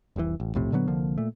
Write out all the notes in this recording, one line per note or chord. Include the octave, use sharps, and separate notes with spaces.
F1 C2 B2 E3
A1
B1 F2 A2 C3
A#2 D3 F#3 B3
C2 D3 F3 A#3
A#2 A3